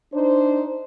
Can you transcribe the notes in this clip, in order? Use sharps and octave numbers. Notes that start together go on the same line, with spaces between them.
D4 D#4 C5